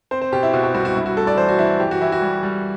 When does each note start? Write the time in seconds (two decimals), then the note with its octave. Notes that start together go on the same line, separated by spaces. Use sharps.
0.11 C4 C5
0.22 C5
0.32 B2 G4
0.43 E4
0.53 B2 F#4
0.64 G4
0.75 C2 F#4
0.85 F#4
0.96 G2 E4
1.06 F#4
1.17 A3 A4
1.27 D5
1.37 E3 C5
1.49 F#4
1.58 E3 E4
1.80 E3 G4
1.91 F#4
2.01 E3 E4
2.12 F#4
2.22 G3
2.43 G3